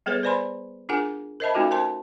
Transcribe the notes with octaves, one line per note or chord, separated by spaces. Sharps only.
G3 B3 G#4 A4 B4 C#5
B4 C5 D5 G#5 B5 C6
D4 F4 G#4 A#4 F#5 G#5
A#4 C5 D#5 E5 A5 B5
A3 C#4 D#4 F4 F#4 A4
C#4 A#4 C5 A5 C6